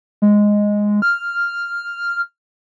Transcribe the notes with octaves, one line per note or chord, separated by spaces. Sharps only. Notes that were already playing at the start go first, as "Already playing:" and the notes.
G#3
F6